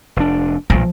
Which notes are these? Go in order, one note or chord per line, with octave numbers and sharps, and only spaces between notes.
F1 D4
B1 A#2 F3